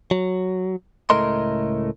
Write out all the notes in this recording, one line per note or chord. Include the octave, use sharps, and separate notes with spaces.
F#3
C#2 A2 A3 A#4 D#5 C6